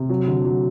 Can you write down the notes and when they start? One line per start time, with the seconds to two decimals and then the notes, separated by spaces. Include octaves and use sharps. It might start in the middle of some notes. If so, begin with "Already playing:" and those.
Already playing: C3
0.09 F#3
0.27 D3
0.45 F#3